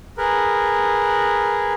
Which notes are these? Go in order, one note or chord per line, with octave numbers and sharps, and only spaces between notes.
G#4 A#4 B4